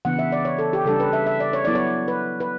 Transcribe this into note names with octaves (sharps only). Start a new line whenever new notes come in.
C#3 E3 B3 D4 F#5
E5
D5
C#5
A4
G4
C#3 G3 D4 A4
B4
E5
E5
D5
C#5
F#3 B3 E4 D5
C#5
B4
B4